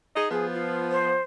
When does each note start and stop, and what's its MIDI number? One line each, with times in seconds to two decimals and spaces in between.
0.16 0.29 63
0.16 0.29 68
0.16 0.29 75
0.30 1.17 53
0.30 1.17 59
0.30 0.46 68
0.53 0.78 65
0.91 1.22 72